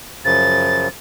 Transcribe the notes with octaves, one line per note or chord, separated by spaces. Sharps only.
F#2 C#3 F3 A6